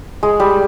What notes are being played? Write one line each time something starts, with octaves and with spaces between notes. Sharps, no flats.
G#3
G3